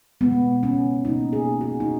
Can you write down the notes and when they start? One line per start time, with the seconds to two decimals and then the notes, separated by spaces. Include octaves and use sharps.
0.21 B2 G#3 B3
0.63 C#4
1.05 B2 A#3 D#4
1.33 G#4
1.61 F#4
1.80 D#4